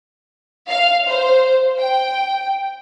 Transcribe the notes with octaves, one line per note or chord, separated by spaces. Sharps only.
F5
C5
G5